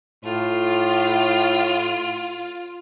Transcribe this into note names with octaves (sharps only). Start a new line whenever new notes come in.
A2 F4